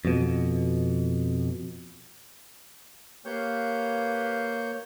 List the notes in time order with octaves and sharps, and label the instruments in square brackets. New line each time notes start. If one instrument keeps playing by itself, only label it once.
[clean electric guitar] F2 B2
[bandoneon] A#3 C#5 G6 [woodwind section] G4 B4 F5